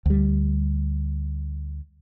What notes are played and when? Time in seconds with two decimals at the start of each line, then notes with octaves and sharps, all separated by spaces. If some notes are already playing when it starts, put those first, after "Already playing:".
0.06 D2 G3